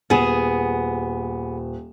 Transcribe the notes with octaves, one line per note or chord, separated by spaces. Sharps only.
D#1 B3 G#4 E7